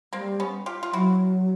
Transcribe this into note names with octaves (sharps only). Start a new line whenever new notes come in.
G3 A#3 C4
B3 C#4
F4 G4
F4
F#3 E4 F#4